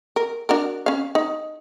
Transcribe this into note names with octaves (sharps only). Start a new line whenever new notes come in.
A#4
D4 F#4 A#4
C#4 F5
D#4